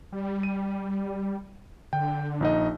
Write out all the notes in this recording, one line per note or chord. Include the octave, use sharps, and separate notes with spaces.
G3
D#7
D3 G5
A#1 D#4 D#5